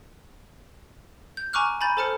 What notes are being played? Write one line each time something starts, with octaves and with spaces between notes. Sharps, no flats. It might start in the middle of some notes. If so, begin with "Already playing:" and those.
G6
G#5 A#5 C#6 D6 F6 F#6
G#5 A#5 B5 G6 A6
A4 C5 A5 F6 C#7